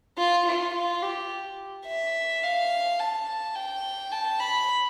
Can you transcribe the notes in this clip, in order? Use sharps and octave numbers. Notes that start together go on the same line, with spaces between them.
F4
F4
F4
G4
E5
F5
A5
G5
A5
B5